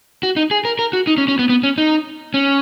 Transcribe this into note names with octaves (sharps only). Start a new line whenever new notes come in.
F#4
D#4
G#4
A#4
A#4
F#4
D#4
C#4
C#4
B3
B3
C#4
D#4
C#4